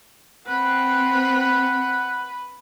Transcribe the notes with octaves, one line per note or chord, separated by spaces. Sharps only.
C4 B4 F#5